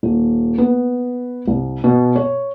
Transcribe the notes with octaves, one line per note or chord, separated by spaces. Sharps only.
D#1
B3
C2
B2
C#5